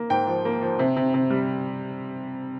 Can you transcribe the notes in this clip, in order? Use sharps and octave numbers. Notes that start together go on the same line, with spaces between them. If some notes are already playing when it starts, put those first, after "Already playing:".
Already playing: A#3
G#2 G5
F3
A#3
F3
C3
C3
C3
G3